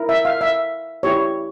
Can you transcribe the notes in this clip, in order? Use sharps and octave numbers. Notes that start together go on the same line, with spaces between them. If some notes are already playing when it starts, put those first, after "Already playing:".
Already playing: E4 A#4
E5
F5
E5
E4 G4 C#5